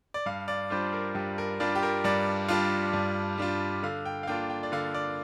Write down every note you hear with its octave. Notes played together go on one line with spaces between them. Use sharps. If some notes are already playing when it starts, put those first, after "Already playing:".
D5
G2 F5
D5
G3 D4 F4 C5
A#4
G2 G4
A#4
G3 D4 F4 D5
G4
A#4
G2 D5
G3 D4 F4
G2
G3 D4 F4
D3 F5
G5
F5
A#3 D4 F4 G5
G5
D5
D3 F5
D5